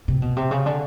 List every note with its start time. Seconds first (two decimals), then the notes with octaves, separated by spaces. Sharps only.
0.08 C3
0.22 B2
0.36 C3
0.51 C#3
0.66 D3